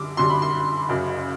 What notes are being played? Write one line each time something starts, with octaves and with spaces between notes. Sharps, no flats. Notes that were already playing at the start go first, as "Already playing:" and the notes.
Already playing: F#2 D3 G3 D6
F#2 D3 G3 C6
B5
C6
F#1 F#2 C#3